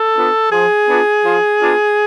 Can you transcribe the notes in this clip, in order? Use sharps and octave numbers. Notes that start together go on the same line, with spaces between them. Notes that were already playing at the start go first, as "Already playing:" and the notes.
Already playing: A4
B3 D4 F4
F3 G#4
B3 D4 F4
F3
B3 D4 F4